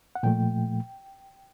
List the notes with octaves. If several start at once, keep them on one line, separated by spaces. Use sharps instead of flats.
F#5
A#2 F3 A3 G5